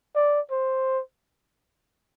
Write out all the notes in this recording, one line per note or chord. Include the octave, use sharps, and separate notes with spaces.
D5
C5